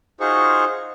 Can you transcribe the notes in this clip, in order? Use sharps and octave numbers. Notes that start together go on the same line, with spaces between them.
D#4 F4 F#4 G#4 C5 C#6